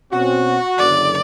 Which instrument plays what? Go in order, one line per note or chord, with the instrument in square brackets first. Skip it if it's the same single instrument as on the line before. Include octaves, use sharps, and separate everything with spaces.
[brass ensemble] B2 C4 C#4 [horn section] F#4
[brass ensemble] F#1 D3 F#3 [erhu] D5